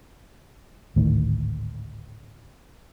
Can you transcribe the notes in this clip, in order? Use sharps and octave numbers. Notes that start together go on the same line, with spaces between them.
G#1 D2 A2 D#3